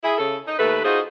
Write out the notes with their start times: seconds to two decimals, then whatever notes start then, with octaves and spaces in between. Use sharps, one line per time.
0.02 E4 G#4
0.18 C#3 A4
0.46 D#4
0.58 D#2 A3 A4 B4
0.84 D#4 F4 F#4 G#4 C5